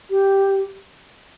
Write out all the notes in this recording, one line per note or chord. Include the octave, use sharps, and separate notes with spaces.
G4